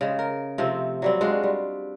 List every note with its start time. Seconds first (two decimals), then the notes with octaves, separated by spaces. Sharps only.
0.01 C#3 G#3
0.19 A#4
0.58 C3 F3 A3 C4
1.02 F#3 G3 C4
1.21 G#3 D4 F4 F#4
1.43 G3